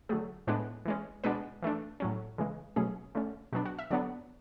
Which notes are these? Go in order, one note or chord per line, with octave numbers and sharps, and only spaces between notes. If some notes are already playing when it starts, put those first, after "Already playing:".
D3 F#3 A3 G#4
A2 G#3 B3 D4 B4
E3 G#3 C#4
B2 G#3 B3 D4 B4
E3 A3 D4
A2 F#3 C#4
C#3 E3 G#3
B2 F#3 A3 C#4 G#4
D3 A3 C#4
B2 F#3 B3 D4 F#4
F#4
E5
D3 F#3 B3 D4 D5